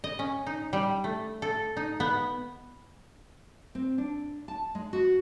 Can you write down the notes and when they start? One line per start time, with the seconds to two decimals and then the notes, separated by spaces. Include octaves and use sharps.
0.04 D#5
0.19 C#4
0.46 D#4
0.73 G3
1.04 A3
1.42 A4
1.77 D#4
2.00 B3
3.75 C4
3.98 D4
4.48 A5
4.75 G#3
4.93 F#4